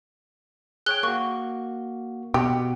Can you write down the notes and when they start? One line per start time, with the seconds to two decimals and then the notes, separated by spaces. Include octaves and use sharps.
0.86 G#4 C#5 G5 F#6 G7
1.03 A#3 F#4 C#6
2.34 B2 G4